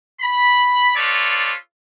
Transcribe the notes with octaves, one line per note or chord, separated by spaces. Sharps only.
B5
D#4 F4 A4 B4 C#5 D5